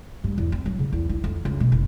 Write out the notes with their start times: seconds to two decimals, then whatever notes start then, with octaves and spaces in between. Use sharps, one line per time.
0.24 G2
0.38 E2
0.52 C4
0.66 F#3
0.79 C#3
0.93 E2
1.09 E4
1.24 F2
1.45 C#2
1.60 B2
1.72 F#1